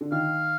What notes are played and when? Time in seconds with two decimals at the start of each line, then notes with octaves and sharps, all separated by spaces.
0.01 D3
0.12 D#3 F5